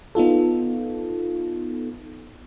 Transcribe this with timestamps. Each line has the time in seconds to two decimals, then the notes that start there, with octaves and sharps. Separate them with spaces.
0.15 B3 D#4 F4 A4